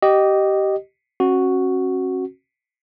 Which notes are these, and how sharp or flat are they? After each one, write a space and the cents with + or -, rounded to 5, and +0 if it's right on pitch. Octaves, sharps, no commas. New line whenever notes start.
G4 -20 D#5 -10
C#4 -40 F#4 +0